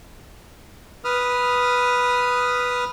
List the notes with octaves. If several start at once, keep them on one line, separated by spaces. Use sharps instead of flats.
B4 D#6 F6